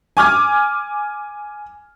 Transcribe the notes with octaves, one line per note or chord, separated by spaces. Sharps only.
G#5 D6 F6 G#6